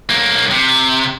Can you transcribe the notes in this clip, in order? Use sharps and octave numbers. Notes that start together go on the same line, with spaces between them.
B1 A#3
C3